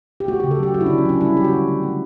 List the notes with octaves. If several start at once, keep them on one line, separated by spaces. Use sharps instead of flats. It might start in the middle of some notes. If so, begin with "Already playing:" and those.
G4
A3 F#4
G4
C#3
A4
F#3 G4
F#3 F#4
E4
D4
D3
C#4
F#3 D4
G3 E4
G3 G4
F#4
D3
A3
A3